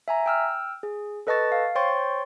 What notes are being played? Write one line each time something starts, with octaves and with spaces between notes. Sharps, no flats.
E5 G#5 A#5
G5 E6 F6
G#4
A4 B4 D#5 A5 C#6 A6
F5
C5 C#5 G5 C6 C#6 A6